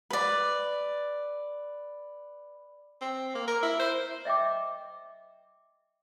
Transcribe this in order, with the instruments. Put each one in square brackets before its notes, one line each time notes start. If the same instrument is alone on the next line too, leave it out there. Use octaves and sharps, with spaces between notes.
[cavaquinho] B4 D5
[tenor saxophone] C4
A#3
A#4
E4
C5
[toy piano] D#5 E5 G5 D6